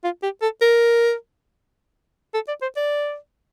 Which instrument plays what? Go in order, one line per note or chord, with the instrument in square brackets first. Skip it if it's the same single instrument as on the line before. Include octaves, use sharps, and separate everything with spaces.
[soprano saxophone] F4
G4
A4
A#4
A4
D5
C5
D5